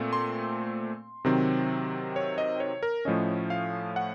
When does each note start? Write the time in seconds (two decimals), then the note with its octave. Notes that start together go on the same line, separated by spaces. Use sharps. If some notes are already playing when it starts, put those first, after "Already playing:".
Already playing: A#2 A3 C4
0.13 C6
1.25 C3 D#3 F#3 C4
2.16 C#5
2.38 D#5
2.60 C#5
2.83 A#4
3.05 A2 F3 A3 C#4 D#5
3.50 F5
3.96 F#5